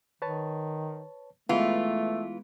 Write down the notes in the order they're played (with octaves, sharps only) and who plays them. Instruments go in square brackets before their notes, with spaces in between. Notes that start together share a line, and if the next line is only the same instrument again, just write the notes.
[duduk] D#3 [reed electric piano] B4 C#5 A5
[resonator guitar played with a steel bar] E3 F4 [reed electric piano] G#3 B3 [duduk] A3